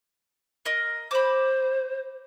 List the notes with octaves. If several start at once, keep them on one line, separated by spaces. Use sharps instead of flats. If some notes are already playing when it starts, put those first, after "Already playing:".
A#4 D#5
C5 B5 D6